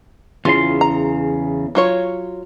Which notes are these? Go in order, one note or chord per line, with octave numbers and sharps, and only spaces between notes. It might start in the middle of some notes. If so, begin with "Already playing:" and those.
E2 C#3 F4 C6
A#5
F#3 F4 C#5